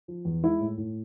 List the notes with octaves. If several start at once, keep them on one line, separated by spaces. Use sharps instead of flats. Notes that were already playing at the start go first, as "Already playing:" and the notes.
F3
E2
G#3 E4
A2
A2